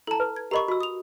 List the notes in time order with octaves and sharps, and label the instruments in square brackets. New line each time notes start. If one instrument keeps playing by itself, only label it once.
[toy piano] E4 A#5 [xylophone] A4 A5
[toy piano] B4
[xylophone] G#6
[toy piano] G4 A#4 D#5 [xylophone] A#5 B5 C#6
[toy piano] F#4 E6 [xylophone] B5
[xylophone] D#6 F7